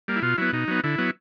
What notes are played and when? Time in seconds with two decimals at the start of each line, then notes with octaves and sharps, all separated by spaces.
0.08 G3 A#3
0.16 E4
0.22 B2 F4
0.38 F#3 B3 E4
0.52 B2 D#4
0.68 F#3 B3
0.84 D3 E4
0.98 F#3 B3